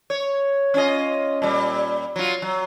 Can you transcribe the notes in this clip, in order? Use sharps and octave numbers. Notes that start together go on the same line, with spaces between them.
C#5
C#4 F4 D#5
A#2 G3
F#3 F4
F#3